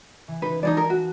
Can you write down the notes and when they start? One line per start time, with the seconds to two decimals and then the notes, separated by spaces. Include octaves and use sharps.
0.28 E3
0.42 E3 D#4 B4
0.63 E3 F3 A3 D#4 G#4 D5
0.77 A#4
0.90 F#4